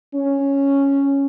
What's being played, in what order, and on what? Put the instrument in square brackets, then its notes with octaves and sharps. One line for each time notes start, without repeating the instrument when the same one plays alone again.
[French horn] C#4